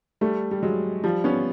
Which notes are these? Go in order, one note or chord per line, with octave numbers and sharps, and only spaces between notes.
G3 A3
G3
F#3 G#3
F3 G3
B3 C#4